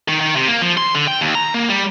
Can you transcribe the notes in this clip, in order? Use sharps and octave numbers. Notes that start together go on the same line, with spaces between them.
D#3
D#3
C3
A#3
F3
C6
D3
G5
D#2
A#5
A#3
G3